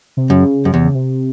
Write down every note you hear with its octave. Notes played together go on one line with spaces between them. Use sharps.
C3
F#2 C#3
F#2
E2 C3
C#3
C3